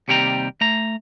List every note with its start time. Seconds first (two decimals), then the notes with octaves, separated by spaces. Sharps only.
0.08 D#2 C3 G3 G5 A#5
0.61 A3 A#5